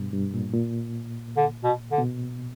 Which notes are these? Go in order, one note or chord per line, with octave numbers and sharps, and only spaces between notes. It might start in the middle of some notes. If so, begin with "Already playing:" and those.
Already playing: G2 B2
G2
A#2
A#2
D3
B2
D3
B2